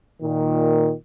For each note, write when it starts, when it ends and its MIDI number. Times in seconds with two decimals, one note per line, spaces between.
0.22 0.92 46
0.22 0.92 51